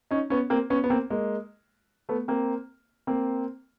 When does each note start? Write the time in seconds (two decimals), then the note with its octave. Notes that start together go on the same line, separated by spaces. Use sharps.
0.11 C#4 D#4
0.30 B3 C#4
0.50 A#3 C4
0.70 B3 C#4
0.84 B3
0.90 A#3 C4
1.10 G#3 A#3
2.09 A3 B3
2.28 A#3 C4
3.07 A#3 C4